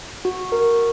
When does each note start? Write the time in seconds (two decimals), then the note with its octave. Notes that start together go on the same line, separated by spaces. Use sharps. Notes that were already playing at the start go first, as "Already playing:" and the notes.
0.25 F#4
0.52 A#4